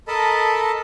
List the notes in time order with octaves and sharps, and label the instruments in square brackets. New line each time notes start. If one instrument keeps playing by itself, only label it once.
[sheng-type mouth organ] A4 A#4 D#5 A5 B5